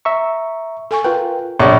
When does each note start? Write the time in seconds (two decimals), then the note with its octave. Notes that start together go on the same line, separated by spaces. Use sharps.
0.05 E5 A#5 C#6
0.91 A4 G#5 C#6
1.04 F4 A#4 B4 G5
1.60 A#1 G2 C3 C#5 C#6